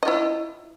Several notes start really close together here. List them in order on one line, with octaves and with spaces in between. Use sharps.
D#5 F4 E4